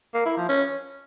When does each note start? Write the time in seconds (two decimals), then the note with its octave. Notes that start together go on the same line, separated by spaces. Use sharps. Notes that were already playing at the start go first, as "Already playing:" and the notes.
0.14 A#3
0.26 E4
0.37 F3
0.49 C#4